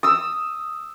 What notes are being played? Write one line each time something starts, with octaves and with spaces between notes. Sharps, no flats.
D#6 E6